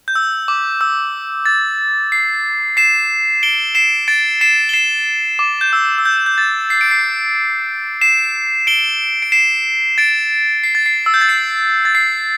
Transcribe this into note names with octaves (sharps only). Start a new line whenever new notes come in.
G6
E6
D6
E6
A6
C7
C7 E7
D7 G7
C7 E7
A6 D7
C7 E7
G7
C7 E7
D6
G6
E6
E6
G6
G6
A6
C7
D7
C7
C7 E7
D7 G7
D7
C7 E7
A6 D7
C7
A6
C7
E6
G6
A6
C7
A6
C7